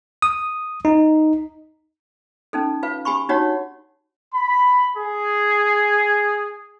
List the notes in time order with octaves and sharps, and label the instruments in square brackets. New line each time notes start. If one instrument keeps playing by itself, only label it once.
[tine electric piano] D#6
D#4
[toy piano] C#4 D#4 A4
F4 B4 F5
G4 G#5 B5 C#6
D4 D#4 F#4 G4 C#5 F#5
[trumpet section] B5
G#4